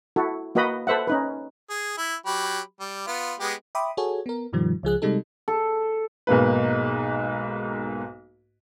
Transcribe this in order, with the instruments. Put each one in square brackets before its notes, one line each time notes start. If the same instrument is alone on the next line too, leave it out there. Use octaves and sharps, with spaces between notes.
[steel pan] E4 F#4 A4
A#3 F#4 B4 D#5 B5
A4 B4 C5 E5 F#5
C#4 D#4 B4
[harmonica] G#4
E4
F#3 G4 B5
G3
B3 F4
G#3 B3 G4
[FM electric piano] E5 G5 B5 C6 D6 D#6
F#4 G#4 A4 C#5 G#5
B3 A#4
G2 B2 D#3 F3 G3
C#2 F3 G#4 F#6
C3 G3 G#3 D#4 A4
[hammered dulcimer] A4
[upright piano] B1 G#2 A#3 B4